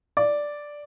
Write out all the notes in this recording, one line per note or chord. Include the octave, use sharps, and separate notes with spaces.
D5